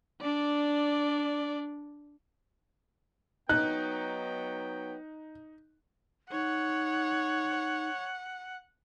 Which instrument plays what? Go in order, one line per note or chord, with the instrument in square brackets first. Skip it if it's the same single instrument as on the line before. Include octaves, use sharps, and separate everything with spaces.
[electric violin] D4 D5
[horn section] F#3 B3 G5 [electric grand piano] D#4 [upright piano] F#6
[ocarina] D#4 [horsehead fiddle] C#5 [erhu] F#5